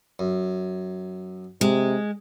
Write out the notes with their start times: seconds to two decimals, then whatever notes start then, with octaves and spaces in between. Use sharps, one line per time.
0.19 F#2
1.61 C3 G#3